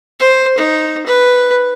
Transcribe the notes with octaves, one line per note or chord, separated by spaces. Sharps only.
C5
D#4
B4